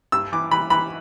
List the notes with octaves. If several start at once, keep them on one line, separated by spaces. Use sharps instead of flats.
G2 E6
E3 D6
E3 B5
E3 B5